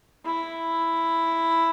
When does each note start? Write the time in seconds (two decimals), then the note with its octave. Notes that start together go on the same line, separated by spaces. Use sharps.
0.25 E4